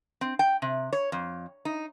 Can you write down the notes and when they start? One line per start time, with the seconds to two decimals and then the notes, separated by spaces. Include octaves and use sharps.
0.21 C4
0.39 G5
0.62 C3
0.93 C#5
1.12 F2
1.65 D#4